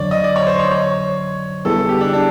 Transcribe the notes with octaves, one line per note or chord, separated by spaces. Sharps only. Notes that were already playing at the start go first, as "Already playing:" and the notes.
Already playing: F2 D3 F#3 C#5 D5
D#5
D5
C#5
C5
C#5
C#5
D3 G3 B3 E4 G#4 A4
G4
D4
D4